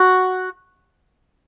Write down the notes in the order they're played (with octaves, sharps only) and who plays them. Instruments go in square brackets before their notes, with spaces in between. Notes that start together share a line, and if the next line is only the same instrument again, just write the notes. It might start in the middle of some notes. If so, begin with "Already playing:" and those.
Already playing: [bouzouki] F#4